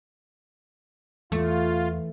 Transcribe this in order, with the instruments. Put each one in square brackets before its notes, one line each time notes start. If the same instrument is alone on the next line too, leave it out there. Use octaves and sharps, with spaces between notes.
[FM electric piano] E2 [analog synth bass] E3 [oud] A3 [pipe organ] F4